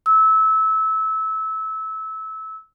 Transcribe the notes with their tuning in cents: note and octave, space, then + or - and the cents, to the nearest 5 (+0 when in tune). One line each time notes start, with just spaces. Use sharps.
E6 -25